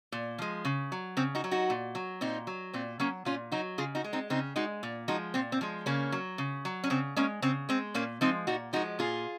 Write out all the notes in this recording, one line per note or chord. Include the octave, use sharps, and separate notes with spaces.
A#2
F3 G#3
C#3
F#3
C#3 C4
D#4 F#4
F#3
D#4 F#4
A#2
F#3
A#2 C4 D#4
F#3
A#2 C4
F#3 A#3 C#4
A#2 C#4 F4
F#3 D#4 F#4
C#3 F4 G#4
D#4 F#4
G#3
C4 D#4
C#3 C4 D#4
G#3 D#4 F#4
A#2
F3 G#3 D#4 F#4
A#2 C4
C4
F3 G#3
C#3 A#3 C#4
F#3
C#3
F#3
C#4
C#3 C4
G#3 A#3 C#4
C#3 C4
G#3 C4
A#2 A#3 C#4
F3 G#3 C4 D#4
A#2 D#4 F#4
F3 G#3 D#4 F#4
A#2 F4 G#4